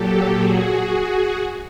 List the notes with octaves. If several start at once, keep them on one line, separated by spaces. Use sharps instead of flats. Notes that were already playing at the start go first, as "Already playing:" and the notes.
Already playing: A#2 F#3 G4 A4
F#4 G#4